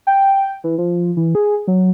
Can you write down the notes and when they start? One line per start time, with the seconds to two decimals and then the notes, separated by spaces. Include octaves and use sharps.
0.07 G5
0.64 E3
0.78 F3
1.17 E3
1.35 G#4
1.68 F#3